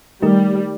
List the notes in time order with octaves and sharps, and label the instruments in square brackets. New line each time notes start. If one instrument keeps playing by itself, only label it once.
[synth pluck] D#3 A3 D#4 G4 A#4 [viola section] G3